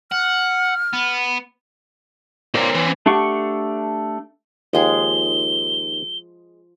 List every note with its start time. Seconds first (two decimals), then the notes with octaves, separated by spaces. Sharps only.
0.12 F#5 F6
0.93 B3
2.55 C#4 A#4 C5 D5
2.75 E3
3.06 A3 D4 G4 F#5 C#6
4.73 D#2 F3 G#3 G#4 G7